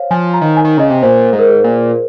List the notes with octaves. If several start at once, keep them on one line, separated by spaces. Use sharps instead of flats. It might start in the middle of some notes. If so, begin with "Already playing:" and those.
Already playing: C5 C#5 F5
F3 G#5
A#5
D#3
G#5
D#3
C#3 D#5
C3
A#2 C5
G#2
A#4
G#4
A#2